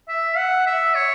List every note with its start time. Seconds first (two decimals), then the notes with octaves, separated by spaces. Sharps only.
0.09 E5
0.37 F#5
0.67 E5
0.95 C#5